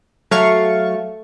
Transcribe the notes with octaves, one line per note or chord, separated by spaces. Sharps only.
F#3 A3 F5 C#6